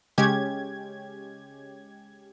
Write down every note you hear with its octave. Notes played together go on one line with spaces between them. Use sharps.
C#3 G#3 C#4 G4 G#6